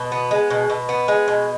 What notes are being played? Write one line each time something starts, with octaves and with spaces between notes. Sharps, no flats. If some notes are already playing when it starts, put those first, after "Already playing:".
Already playing: B2
B3
G#3
B2
B2
B3
G#3
B2